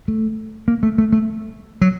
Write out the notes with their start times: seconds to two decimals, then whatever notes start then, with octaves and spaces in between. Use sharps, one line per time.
0.08 A3
0.68 A#3
0.83 A3
0.98 A3
1.13 A3
1.81 F#3